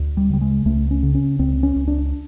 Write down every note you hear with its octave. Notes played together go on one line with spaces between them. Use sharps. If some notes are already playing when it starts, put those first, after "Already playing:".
Already playing: D2
G3
C#3 G3
G#3
C#2 A3
C#4
C#3
C#4
C#2 C4
C#4
C#2
D4